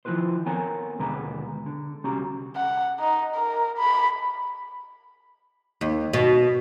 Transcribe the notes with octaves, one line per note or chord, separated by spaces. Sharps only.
D#3 F3 C#4 E4 B4 C5
B3 C4 A4 A#4 C#5 G#5
D#2 B2 D3 G#3 B4 A#5
D3
C2 C#4 F#4 G4 A#5
F#5
D#4
A#4
B5
D#2
B2